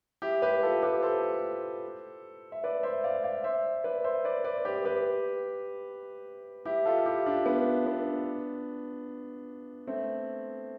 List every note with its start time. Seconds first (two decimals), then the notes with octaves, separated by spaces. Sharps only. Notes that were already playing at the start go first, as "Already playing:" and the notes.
0.22 E4 G4
0.42 G4 B4
0.63 F4 A4
0.83 G4 B4
1.02 A4 C5
2.52 E5
2.64 B4 D5
2.83 C5 E5
3.04 D5 F5
3.24 D5 F5
3.44 C5 E5
3.84 B4 D5
4.04 C5 E5
4.24 B4 D5
4.44 B4 D5
4.65 G4 B4
4.85 G4 B4
6.65 E4 G4
6.85 F4 A4
7.06 E4 G4
7.26 D4 F4
7.46 B3 D4
7.86 B3 D4
9.87 A3 C4